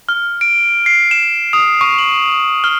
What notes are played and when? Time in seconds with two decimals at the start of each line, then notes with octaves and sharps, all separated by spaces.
0.09 F6
0.41 D7
0.86 C7
1.11 E7
1.53 D#6
1.81 C#6
1.98 F#7
2.64 F6